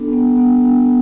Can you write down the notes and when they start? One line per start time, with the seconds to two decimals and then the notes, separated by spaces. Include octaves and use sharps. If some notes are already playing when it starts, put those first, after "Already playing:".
Already playing: B3 D4 A4
0.13 B3
0.38 B3
0.64 D4